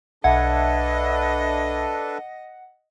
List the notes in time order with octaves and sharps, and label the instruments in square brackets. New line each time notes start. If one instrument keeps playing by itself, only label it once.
[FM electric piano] B1 E5 G#6 [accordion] D4 A4 B4 [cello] D#5 [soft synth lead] F#5